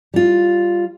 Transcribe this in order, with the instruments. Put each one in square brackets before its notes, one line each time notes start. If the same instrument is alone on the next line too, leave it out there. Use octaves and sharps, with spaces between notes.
[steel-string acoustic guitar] G3 F4